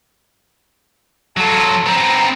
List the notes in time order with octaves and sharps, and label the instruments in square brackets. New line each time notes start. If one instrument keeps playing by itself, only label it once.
[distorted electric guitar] F#3 F4 [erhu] A4
[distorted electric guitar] B3 C4 [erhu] A#5